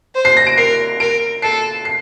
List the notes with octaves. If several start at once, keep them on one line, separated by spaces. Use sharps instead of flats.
C5
C7
A#6
D7
A#4 C7
A#4 D7
A4 C7
C7